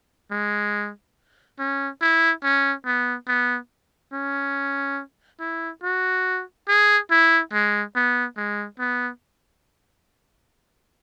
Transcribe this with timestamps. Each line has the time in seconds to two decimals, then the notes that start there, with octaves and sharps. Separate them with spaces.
0.31 G#3
1.59 C#4
2.01 E4
2.44 C#4
2.85 B3
3.28 B3
4.13 C#4
5.40 E4
5.83 F#4
6.68 G#4
7.11 E4
7.53 G#3
7.95 B3
8.37 G#3
8.79 B3